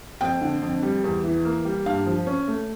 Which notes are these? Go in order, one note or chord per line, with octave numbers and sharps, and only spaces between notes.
F2 G5
D3
F2
G3
E2
E3
A#3
G3
G2 F5
F3
C#4
A3